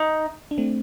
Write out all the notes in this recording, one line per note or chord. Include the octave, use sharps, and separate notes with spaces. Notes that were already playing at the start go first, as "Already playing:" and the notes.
Already playing: D#4
D4
A3 C4